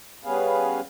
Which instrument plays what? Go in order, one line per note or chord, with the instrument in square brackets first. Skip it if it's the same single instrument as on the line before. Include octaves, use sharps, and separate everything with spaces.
[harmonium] G3 B3 C#4 G#4 B4 F5